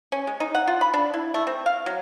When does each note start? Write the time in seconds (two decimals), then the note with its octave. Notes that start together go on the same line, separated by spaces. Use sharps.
0.12 C#4
0.27 G#3
0.40 D#4
0.55 F#5
0.67 F4
0.81 B5
0.94 D4
1.14 E4
1.34 A3
1.47 C4
1.66 F5
1.86 F#3